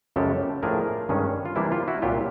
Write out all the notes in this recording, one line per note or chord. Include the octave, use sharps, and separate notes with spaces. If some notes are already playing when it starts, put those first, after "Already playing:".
F#2 C#3 F3 G#3 G4 A4
A2 F3 A3 D4 G#4 A#4
G2 D#3 G#3 C#4
F4
C3 E3 G3 A#3 D4 E4
F4
E4 F#4
C2 A#2 F#3 F4 G4